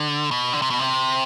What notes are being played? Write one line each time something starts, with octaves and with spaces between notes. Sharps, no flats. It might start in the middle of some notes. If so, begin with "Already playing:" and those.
Already playing: D3
B2
D3
C3
B2
C3